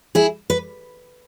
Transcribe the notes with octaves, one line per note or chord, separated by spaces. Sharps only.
E4 G#4
B4